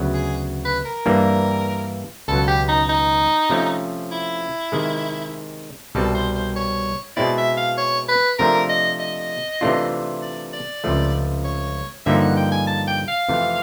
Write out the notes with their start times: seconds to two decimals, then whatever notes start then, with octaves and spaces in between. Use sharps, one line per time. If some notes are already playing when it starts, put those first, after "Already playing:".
Already playing: D2 C#3 F#3 B3
0.14 G#4
0.65 B4
0.85 A#4
1.06 G2 E3 G3 A#3 D4
2.28 C#2 B2 F#3 A4
2.48 G4
2.68 D#4
2.89 D#4
3.50 C3 F3 A3 C#4
4.12 E4
4.72 C3 D#3 G#3
5.95 C2 B2 G3 C4 A4
6.14 C5
6.35 C5
6.56 C#5
7.17 B2 G#3 C4 E4 D5
7.38 E5
7.57 F5
7.78 C#5
8.09 B4
8.39 C3 F3 A3 D4 A#4
8.70 D#5
9.00 D#5
9.61 C3 E3 A3 D4 F4
10.22 D5
10.53 D5
10.84 C#2 C3 F3 A3
11.44 C#5
12.06 G2 D3 F3 A#3 D#4 E5
12.21 F#5
12.37 G5
12.52 G#5
12.67 A5
12.88 G5
13.08 F5
13.29 F2 C3 E3 A3